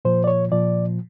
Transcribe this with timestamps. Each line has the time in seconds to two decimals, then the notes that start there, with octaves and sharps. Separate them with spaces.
0.05 A#2 F3 C5
0.24 D5
0.27 C#5
0.52 A#2 F3 D5